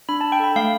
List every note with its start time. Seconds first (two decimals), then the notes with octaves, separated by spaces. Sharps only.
0.09 D4 B5
0.21 A5
0.24 D4
0.32 G5
0.40 A4 B5
0.56 A3 F5